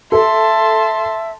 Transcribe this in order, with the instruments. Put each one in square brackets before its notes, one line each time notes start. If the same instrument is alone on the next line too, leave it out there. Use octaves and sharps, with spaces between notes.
[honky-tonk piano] A4 [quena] E5 [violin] A5 C6